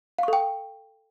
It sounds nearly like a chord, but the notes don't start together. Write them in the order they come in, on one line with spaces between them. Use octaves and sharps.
F5 C#6 A4 G5